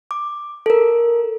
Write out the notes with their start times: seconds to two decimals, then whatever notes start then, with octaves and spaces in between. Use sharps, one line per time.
0.11 D6
0.66 A4 A#4